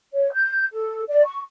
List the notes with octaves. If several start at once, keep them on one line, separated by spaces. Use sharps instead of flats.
C#5
G6
A4
D5
C#6